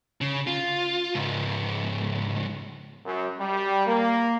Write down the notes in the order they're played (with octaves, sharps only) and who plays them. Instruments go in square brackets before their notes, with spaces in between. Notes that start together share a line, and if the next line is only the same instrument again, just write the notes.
[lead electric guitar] C#3
F4
C#2 G#2
[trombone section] F#2
G3
A#3